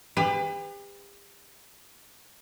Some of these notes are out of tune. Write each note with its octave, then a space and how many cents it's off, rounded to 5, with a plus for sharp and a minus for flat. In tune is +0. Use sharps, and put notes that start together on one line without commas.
G4 +40 B4 +35